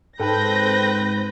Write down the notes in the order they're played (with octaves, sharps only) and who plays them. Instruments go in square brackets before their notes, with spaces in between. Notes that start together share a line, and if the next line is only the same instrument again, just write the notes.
[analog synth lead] G#2 [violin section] C4 G6 A#6 [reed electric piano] A4 G5 A5 [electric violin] B4